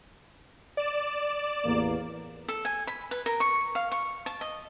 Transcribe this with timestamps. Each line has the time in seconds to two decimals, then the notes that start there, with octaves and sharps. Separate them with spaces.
0.77 D5 E7
1.65 A1 E2 A#3
2.48 A4
2.65 G#5
2.87 B5
3.11 B4
3.26 A#4
3.40 C#6
3.75 F5
3.92 C#6
4.26 A5
4.41 D#5